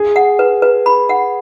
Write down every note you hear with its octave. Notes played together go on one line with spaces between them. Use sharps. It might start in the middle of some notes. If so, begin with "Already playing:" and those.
Already playing: G#4
F#5
B4
B4
B5
F#5